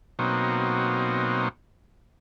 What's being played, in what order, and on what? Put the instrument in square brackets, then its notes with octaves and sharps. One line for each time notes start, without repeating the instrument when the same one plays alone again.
[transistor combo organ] B2 F#3 A#3 C4 D#4